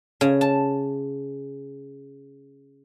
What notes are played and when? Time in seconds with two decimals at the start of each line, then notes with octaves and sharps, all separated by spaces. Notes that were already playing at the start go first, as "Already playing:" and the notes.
0.21 C#3
0.41 A5